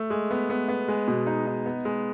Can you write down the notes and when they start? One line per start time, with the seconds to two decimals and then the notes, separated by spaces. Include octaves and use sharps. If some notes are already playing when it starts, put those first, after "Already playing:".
Already playing: A3
0.10 G#3
0.31 B3
0.50 B3
0.68 B3
0.88 G#3
1.08 B2
1.27 D#4
1.47 D#4
1.66 B3
1.85 G#3